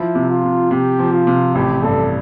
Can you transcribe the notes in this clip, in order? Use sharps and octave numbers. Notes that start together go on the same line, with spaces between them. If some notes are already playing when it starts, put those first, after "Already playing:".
Already playing: F3 E4
C3
F4
C3
C3 G4
F3
F4
C3
A1 G4
G2 A4